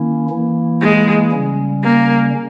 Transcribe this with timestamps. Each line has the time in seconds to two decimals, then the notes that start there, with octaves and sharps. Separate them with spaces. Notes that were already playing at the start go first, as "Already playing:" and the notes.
Already playing: D#3 A#3 C#4 E4
0.29 E3 A#3 E4
0.81 G#3
1.32 C#3 G3 C#4
1.84 A#3